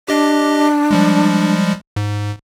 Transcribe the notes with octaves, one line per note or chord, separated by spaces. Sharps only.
D4 G4 D#5
F3 G3 G#3
G#2